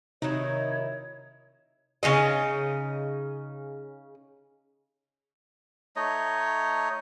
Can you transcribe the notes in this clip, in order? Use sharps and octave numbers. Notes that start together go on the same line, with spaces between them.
C3 D#3 F#3 D#4 E4 C#5
C#3 F#3 D#4 D#5
A3 D#4 C#5 D#5